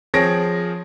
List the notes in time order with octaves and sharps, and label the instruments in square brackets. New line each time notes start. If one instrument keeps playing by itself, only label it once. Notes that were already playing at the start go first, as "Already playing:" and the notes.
[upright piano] F3 C4 G#4 C#5 A#6 D7